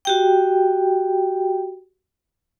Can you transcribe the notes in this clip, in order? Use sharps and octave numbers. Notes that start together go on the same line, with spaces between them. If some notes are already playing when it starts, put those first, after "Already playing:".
F#4 G4 G5